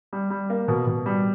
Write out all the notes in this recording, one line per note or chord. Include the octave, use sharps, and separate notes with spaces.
G3
G3
A#3
B2
B2
G3